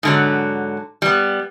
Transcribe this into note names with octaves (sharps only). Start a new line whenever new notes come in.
G#2 D3 F#3
G3 B3